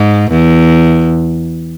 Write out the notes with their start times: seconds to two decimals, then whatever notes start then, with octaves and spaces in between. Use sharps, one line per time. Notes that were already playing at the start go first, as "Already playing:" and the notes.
Already playing: G#2
0.31 E2